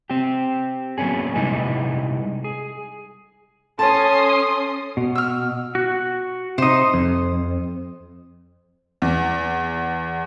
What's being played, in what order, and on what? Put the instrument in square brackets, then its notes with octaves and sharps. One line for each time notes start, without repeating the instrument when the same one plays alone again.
[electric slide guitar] C4 G4
F#3 A#3 B3 C#4 G#4
C3 G3 G#3 D#4 E4 B4
G#4
[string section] C#4 D#6 [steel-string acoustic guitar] A4 C#5 [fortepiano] A5 [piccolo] C6
[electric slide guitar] B2
[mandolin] E6 F6
[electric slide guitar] F#4
[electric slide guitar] C3 D#4 [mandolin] C5 D#6
[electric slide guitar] F2
[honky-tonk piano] E2